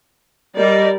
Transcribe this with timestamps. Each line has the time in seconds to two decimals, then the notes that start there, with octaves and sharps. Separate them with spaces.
0.58 G3 A#4 D5 D#5